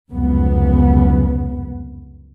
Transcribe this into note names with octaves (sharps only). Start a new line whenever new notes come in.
F1 C#2 F#2 B3